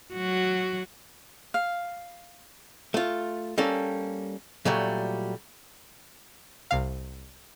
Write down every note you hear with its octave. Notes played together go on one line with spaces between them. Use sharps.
F#3 F#4
F5
A3 F4
G3 A#3 C#4 A4
A#2 F#3 G3 A3
C2 C3 F5